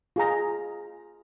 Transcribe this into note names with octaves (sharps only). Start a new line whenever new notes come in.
F4 G#4 A#5